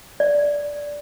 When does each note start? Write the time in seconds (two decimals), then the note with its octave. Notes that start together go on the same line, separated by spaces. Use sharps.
0.20 D5